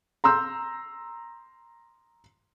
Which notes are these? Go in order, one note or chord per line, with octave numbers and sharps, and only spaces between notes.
A#5 C6 E6 G6